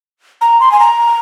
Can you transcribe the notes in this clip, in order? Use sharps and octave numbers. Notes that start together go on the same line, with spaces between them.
A#5
C6
G#5
A#5